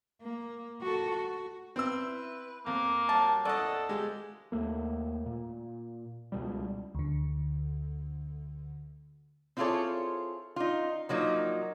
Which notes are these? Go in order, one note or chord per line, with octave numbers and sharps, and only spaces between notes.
A#3
F#4 A4
F#4
C4 E4 B4 E6
F2 A#3
F#3 G3 A5
E2 A2 C#4 A4 D5 D#5 F#5
C3 F3 G#3 G4
D#2 A3 A#3
A#2
C#2 B2 G3
D2 D3
C4 E4 F4 G#4 A4 C#5
D#4 F4
F3 F#3 A#3 D#4